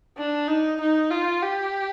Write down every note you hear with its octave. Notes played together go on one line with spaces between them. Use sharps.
D4
D#4
D#4
F4
G4